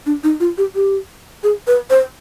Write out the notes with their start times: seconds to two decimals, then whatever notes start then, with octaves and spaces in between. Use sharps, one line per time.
0.06 D4
0.24 D#4
0.40 F4
0.58 G4
0.75 G4
1.43 G#4
1.67 B4
1.90 C5